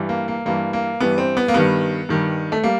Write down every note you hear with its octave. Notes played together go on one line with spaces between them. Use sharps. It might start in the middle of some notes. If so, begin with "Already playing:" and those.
Already playing: G2 E3 G3
A#3
A#3
G2 E3 G3 A#3
A#3
G2 E3 G3 B3
C4
B3
A#3
G2 D#3 G3 B3
G2 D#3 G3
A3
G3 A#3